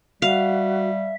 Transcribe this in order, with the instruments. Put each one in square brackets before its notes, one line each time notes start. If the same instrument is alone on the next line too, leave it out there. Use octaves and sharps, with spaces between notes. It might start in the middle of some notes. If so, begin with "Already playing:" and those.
[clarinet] G3 [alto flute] F#4 [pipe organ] E5 [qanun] F5